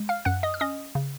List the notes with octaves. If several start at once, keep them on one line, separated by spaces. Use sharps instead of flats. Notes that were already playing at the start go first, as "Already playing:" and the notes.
Already playing: G#3
F5 F6
F#2 F#5 F#6
D#5 D#6
F6
C#4 D#5 D#6
C#3